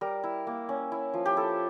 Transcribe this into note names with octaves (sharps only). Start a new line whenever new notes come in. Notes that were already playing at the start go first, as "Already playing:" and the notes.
G3 A#4
E4
A#3
C#4
E4
F3
G4
E4 A4